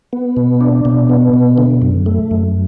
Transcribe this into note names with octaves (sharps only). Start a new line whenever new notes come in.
B3
B2
D4
B2
B3
B2
D3
F#2
A3
F#2